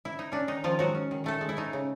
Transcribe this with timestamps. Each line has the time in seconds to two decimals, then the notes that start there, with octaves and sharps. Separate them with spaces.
0.05 E4
0.19 D#4
0.32 C#4 D4
0.48 D#3 D#4
0.64 D#3 F3 F4
0.79 F#3 G#3 F#4
0.95 C#4
1.11 D#3
1.24 D#3 A3 A4
1.41 G#3
1.49 E4
1.57 A3 D#4
1.73 C#3